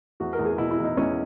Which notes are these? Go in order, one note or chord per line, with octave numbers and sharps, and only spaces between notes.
E2 F#4
A#4
E2
G#4
B2 E4
E4
E2
D#4
E2 C#4